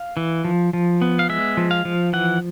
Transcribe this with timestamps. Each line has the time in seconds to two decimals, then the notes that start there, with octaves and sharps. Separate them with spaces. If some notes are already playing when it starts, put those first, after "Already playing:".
Already playing: F5
0.17 E3
0.45 F3
0.73 F3
1.02 B3
1.19 F5
1.29 G#3 E5
1.57 F3
1.71 F5
1.85 F3
2.13 E3 F#5